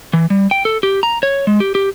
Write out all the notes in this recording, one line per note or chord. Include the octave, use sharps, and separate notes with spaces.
E3
G3
G5
A4
G4
A#5
C#5
G#3
G4
G4